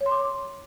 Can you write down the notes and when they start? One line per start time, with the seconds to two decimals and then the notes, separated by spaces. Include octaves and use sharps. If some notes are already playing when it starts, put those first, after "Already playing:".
0.01 C#5
0.06 C6
0.11 D6